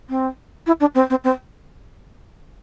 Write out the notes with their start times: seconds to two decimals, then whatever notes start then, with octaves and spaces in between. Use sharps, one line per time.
0.09 C4
0.67 E4
0.80 D4
0.95 C4
1.10 C4
1.24 C4